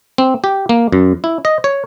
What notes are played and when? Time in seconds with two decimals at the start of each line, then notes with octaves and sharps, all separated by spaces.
0.18 C4
0.44 G4
0.69 A#3
0.92 F#2
1.24 E4
1.45 D#5
1.64 C#5